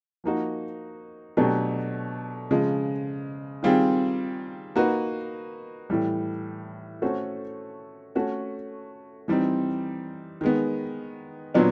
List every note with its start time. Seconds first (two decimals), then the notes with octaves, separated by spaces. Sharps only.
0.24 F3 A#3 D#4 F#4
1.37 B2 F#3 A3 D4 G4
2.51 C#3 F3 G#3
3.63 D#3 G3 C4 F4 G#4
4.76 A#3 D#4 F#4 B4
5.90 A2 E3 G3
7.02 A3 C#4 F#4 A4 C5
8.15 A3 C#4 F#4
9.28 E3 G3 C4 D#4
10.41 D#3 G#3 B3
11.54 A#2 F#3 B3 D4